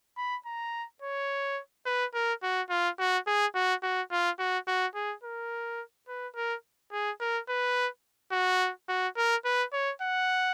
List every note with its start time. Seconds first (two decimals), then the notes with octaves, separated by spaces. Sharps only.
0.17 B5
0.46 A#5
1.02 C#5
1.86 B4
2.14 A#4
2.43 F#4
2.70 F4
2.99 F#4
3.27 G#4
3.55 F#4
3.82 F#4
4.11 F4
4.39 F#4
4.68 F#4
4.95 G#4
5.24 A#4
6.08 B4
6.36 A#4
6.92 G#4
7.20 A#4
7.49 B4
8.32 F#4
8.89 F#4
9.16 A#4
9.45 B4
9.73 C#5
10.02 F#5